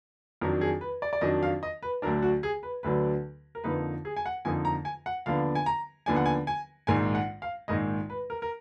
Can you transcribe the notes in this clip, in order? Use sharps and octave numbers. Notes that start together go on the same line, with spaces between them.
F2 D#3 F#3 D4 A#4
G#4
B4
D5
D5
F2 D#3 F#3 D4 D#5
F5
D#5
B4
D2 D3 F#3 D4 A#4
F#4
G#4
B4
D2 D3 F#3 D4 B4
A#4
F2 D3 F3 A#3 D#4 B4
G#4
G#5
F#5
F2 D3 F3 A#3 D#4 G#5
A#5
G#5
F#5
D#2 D3 F3 B3 D4 F5
G#5
A#5
D#2 D3 F3 B3 D4 G#5
F#5
G#5
G#5
A#1 G#2 D#3 G#3 G#5
F#5
F5
A#1 G#2 D#3 G#3 D#5
B4
A#4
A#4